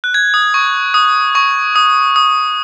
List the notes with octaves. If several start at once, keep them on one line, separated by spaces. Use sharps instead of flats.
F#6
G#6
D#6
C#6
D#6
C#6
D#6
D#6